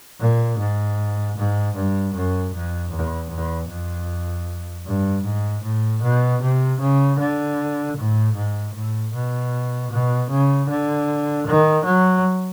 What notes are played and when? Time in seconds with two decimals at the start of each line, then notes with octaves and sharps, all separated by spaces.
0.19 A#2
0.58 G#2
1.37 G#2
1.75 G2
2.14 F#2
2.54 F2
2.92 E2
3.30 E2
3.69 F2
4.86 G2
5.24 G#2
5.63 A2
6.02 B2
6.42 C3
6.81 C#3
7.19 D3
7.97 A2
8.35 G#2
8.74 A2
9.14 B2
9.91 B2
10.30 C#3
10.69 D3
11.47 D#3
11.85 F#3